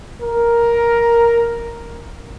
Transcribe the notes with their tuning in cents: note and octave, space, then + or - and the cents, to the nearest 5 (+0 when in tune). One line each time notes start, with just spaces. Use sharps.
A#4 +5